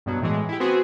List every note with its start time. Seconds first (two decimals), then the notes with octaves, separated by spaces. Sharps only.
0.06 G2 B2 F#3
0.21 A2 E3 G#3
0.49 E4 G4
0.60 B3 C4 F#4 G#4